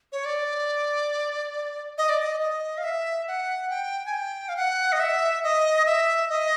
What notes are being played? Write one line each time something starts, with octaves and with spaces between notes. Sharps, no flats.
C#5
D5
D#5
D5
D#5
D#5
F5
E5
F#5
G5
G#5
G5
F5
F#5
D#5
E5
D#5
E5
D#5